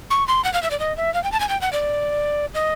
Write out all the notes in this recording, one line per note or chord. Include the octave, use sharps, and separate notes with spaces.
C#6
C6
F#5
F5
E5
D5
D#5
E5
F5
G5
A5
G#5
G5
F#5
D5
D#5